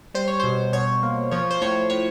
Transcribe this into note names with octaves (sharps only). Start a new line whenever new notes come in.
G3 C5
C#5
B2 C5
B2 C#5
A#3
F3 C#5
C5
A2 C#5
A2 C#5